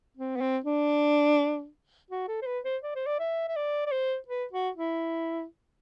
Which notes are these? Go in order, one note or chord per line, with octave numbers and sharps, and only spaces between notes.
C4
B3
C4
D4
F#4
A4
C5
B4
C5
D5
C5
D5
E5
E5
D5
D5
C5
B4
F#4
E4